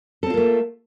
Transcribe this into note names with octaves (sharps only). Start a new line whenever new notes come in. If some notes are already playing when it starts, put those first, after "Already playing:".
A3 A#3 C4 F4 A4